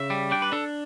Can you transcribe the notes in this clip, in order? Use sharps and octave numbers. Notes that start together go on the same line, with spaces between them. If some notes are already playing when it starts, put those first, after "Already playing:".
Already playing: C#3 E5
G3
D4 G5
B4
D4 A4